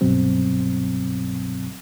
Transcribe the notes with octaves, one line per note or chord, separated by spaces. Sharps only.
C2 G2 B2 F#3 C4